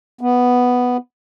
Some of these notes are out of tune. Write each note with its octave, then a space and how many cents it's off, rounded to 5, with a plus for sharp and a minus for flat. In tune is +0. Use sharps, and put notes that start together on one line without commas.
B3 +0